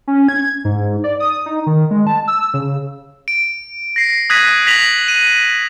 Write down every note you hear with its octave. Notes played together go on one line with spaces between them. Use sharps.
C#4
G#6
G#2
D5
D#6
D#4
D#3
G#3
A5
E6
C#3
D7
A#6 C7
D#6 F#6 G#6 A#6 B6 D#7
G#6 A#6 B6 F7 F#7
D#7